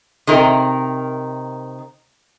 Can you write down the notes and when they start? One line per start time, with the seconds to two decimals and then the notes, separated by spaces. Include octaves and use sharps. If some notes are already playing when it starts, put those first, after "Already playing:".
0.27 C3 D#3 A#4